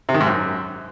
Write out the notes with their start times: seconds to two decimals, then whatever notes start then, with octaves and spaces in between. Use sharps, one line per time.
0.09 C3
0.15 D#3
0.20 G#2
0.26 F#2